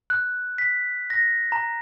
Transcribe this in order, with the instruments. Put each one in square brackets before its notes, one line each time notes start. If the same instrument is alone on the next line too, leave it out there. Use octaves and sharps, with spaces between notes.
[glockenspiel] F#6
B6
A#6
A#5